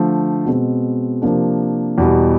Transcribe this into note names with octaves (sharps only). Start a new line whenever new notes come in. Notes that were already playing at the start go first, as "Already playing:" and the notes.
Already playing: D3 F3 A3
B2 G#3 C4
C3 F3 A#3 D4
E2 B2 G3